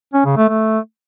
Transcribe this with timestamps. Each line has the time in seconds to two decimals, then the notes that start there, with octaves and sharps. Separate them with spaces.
0.14 C#4
0.25 C#3
0.37 A3
0.48 A3